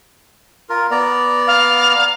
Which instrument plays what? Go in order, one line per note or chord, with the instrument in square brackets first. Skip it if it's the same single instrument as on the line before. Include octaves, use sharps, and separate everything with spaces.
[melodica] F4 A#4
B3 D5 A#5
[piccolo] F5